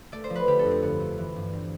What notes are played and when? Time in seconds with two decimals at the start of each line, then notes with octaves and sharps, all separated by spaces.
0.12 A3 D5
0.24 C5
0.30 F3
0.35 B4
0.47 D3 G4
0.59 A4
0.65 F2
0.71 C4
0.82 G2 B3
1.00 A3
1.18 E3
1.36 G2
1.53 G3 C4